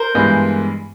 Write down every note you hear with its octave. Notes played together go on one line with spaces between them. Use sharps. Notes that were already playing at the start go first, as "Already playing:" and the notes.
Already playing: A#4 C5
G2 E3 G#3 B3